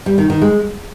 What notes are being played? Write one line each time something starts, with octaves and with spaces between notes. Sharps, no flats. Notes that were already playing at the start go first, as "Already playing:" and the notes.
G3
D#3
D#3
G#3